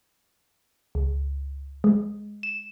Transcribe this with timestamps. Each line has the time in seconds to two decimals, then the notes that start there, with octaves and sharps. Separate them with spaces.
0.95 C#2
1.84 G#3
2.43 E7